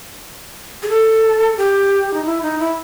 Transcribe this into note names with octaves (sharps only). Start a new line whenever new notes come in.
G#4
A4
G4
D#4
E4
D#4
E4